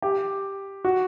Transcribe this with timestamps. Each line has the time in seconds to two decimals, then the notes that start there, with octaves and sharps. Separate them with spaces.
0.02 G4
0.85 F#4